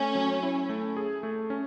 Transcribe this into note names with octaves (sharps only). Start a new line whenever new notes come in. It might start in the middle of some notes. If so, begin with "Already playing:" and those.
Already playing: A3 C#4
F#3
E4
A3
G#4
A3
C#4